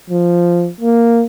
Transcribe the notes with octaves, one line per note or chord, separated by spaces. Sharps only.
F3
A#3